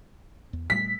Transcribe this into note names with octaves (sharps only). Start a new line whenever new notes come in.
E2
A#2 G3 A3 B6